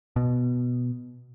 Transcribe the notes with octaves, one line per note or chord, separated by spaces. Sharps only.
B2